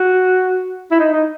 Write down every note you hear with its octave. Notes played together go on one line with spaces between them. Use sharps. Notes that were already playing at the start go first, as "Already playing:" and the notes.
Already playing: F#4
E4
D#4
D#4